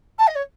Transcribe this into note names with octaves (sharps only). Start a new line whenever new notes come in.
A5
D#5
C#5